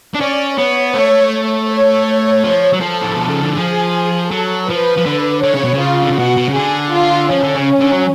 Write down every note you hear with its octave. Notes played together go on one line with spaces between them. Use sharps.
D4
C#4 D5
B3 C#5
A3 C#5
C#5
F3
F#3
F3 A4
A2
B2
C#3
D3
F3 G#4
F#3 A4
F3 B4
F3
D3
D3 C#5
C#3
B2
C#3
F4
D3
C#3
B2 F#4
B2
C#3
D3 G#4
F4
F3 C#4
D3
C#3
D3
F#3